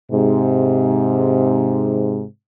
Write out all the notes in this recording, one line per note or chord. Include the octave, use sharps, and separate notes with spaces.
G#2 C3